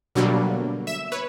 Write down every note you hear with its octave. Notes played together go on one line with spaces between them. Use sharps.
B2 D3 F#3 G3 A#3
E5 E7
B4 C#5